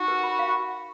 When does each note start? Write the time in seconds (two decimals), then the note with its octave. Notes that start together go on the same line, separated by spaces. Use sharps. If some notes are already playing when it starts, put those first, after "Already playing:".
Already playing: D#4 F#4
0.08 A#4
0.23 B5
0.39 F5